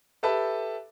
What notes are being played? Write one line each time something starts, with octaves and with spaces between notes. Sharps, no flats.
G4 A4 B4 E5 A5